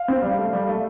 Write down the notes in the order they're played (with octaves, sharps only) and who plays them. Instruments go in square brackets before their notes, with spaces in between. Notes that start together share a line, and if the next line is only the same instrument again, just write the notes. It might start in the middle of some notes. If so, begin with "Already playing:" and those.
Already playing: [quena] F5
[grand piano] C4
G3
A3
G3
A3